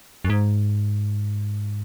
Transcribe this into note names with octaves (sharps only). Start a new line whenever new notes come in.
F#2
G#2